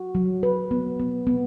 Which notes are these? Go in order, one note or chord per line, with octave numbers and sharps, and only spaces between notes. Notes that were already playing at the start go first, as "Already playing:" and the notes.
Already playing: F#4
F#3
B4
B3
B3
B3